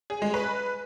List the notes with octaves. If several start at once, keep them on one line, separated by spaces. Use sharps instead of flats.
G#4
G#3
B4